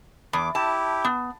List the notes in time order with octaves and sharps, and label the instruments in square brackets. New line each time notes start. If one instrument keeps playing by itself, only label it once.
[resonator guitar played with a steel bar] E2 [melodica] D6
[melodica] E4 G4 [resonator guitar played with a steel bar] A5
[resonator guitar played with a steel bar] B3